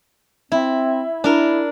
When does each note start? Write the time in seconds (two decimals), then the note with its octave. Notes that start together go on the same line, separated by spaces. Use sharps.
0.52 C4 E4
1.24 D4 E4 A#4